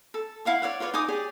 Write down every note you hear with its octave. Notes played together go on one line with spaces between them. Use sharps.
A4
E4 F5 F#5 C#6
C#5 D5 F5 F#5
F4 B4 C#5 D5
D#4 G#5 D6 D#6
G4 G#4 C#5 D5